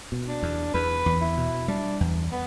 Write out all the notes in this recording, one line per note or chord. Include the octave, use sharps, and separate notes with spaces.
B2
D4
E2
E2 B4
E2
E4
B2
G3 D4
E2
B3